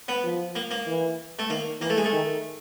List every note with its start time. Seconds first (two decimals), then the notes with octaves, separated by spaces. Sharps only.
0.08 B3
0.24 F3
0.55 A#3
0.71 A#3
0.87 E3
1.39 A3
1.49 D#3 A#3
1.81 E3 A#3
1.90 A3
1.97 G#3
2.05 A3
2.13 D#3